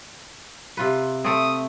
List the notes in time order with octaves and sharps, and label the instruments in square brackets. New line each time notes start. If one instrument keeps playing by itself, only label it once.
[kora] C3 F4 B4
[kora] A3 C4 [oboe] D#6